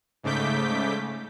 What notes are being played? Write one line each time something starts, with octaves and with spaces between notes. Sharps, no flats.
G#2 C#3 A3 D6 G6 B6